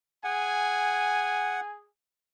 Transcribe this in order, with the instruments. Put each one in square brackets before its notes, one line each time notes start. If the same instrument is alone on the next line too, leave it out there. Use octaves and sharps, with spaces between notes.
[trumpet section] G#4 G#5 [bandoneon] F#5